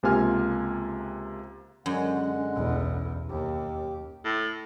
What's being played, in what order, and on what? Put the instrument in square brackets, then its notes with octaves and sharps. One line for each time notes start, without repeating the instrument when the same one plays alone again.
[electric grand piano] C#2 C3 A#3 F4 G#5 F6
[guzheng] F#2 [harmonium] D3 G#3 F#5
[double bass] B1 E2
[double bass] D#2 [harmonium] G4
[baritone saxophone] A2